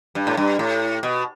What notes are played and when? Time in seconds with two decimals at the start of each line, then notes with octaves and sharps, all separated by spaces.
0.15 G2
0.27 A2
0.37 G2
0.59 A2
1.03 B2